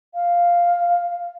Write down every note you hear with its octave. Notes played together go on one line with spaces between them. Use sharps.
F5